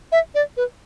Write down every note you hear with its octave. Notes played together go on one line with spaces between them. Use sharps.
E5
D5
B4